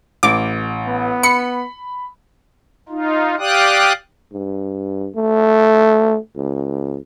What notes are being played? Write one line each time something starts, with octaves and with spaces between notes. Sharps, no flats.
A1 D6
B3
B5 C#7
D#4 F4
G4 D5 F5 G5 D#6 F#6
G2
A3
C#2